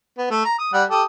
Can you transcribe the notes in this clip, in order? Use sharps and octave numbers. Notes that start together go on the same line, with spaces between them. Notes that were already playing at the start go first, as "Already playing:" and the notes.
B3
A3
A#5
D#6
G3 F#5
G4 A4 D#6